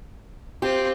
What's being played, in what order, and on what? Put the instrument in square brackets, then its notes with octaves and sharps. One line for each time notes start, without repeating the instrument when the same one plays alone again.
[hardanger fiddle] C4 F4 [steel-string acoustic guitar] G4